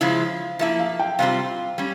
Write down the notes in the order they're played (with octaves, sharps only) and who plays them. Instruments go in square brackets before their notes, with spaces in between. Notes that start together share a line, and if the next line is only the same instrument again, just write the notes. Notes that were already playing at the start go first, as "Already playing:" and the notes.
[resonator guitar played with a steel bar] C#3 F3 G#3 E4 [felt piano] F5
[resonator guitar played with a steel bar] F3 A#3 E4 [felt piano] E5
[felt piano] F5
G5
[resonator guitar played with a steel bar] C3 G3 C4 F4 [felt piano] F5
[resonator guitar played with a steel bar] G3 C#4